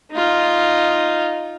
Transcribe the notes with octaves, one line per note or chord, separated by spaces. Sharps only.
D#4 F4